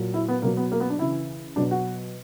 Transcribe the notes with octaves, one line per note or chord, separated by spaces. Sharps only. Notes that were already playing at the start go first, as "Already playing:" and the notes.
Already playing: A#2 F#3
E4
B3
B2 F#3 A#3
B3
A#3
B3
D4
C#3 E3 E4
B2 F#3 D4
F#4